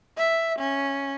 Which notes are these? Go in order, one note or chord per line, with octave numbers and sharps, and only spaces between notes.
E5
C#4